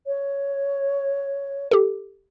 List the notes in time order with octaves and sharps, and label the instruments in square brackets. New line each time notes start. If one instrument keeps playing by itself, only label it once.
[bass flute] C#5
[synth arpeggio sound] G4 A4